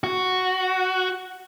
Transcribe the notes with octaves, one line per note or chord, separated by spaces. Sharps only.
F#4